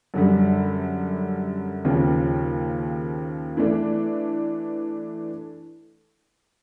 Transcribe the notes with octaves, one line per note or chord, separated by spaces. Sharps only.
F#2 D3 G3
D#2 C#3 F3
E3 A3 D4